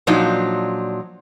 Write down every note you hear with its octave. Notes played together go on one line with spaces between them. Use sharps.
A#2 F3 F#3 D4 D#4